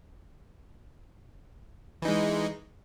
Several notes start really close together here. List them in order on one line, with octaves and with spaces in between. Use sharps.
E3 D#4 G#3